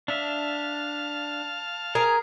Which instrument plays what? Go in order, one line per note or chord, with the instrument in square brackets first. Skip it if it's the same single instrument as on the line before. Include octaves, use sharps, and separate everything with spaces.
[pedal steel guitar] D4 E5 [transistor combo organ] F5 A5 F6
[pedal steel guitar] G#4 [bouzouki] A#4